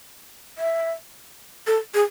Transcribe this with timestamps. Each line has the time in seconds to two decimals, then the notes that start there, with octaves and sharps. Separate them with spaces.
0.58 E5
1.67 A4
1.94 G#4